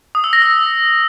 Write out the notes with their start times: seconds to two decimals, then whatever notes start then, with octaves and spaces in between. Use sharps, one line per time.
0.15 D#6
0.24 E6
0.33 A#6
0.42 E6